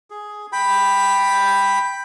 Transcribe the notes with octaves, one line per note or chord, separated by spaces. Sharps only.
G#4
G5 B5